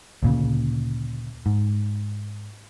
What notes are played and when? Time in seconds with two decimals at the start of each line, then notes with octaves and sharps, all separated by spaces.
0.23 D2 A#2 C#3
1.46 G#2